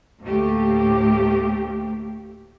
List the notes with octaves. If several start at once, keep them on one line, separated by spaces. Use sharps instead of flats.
D2 A2 A3 A#3 G4